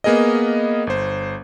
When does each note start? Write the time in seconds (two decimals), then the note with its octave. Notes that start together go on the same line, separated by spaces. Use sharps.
0.04 A#3 B3 G#4 A#4 D#5
0.87 G1 C5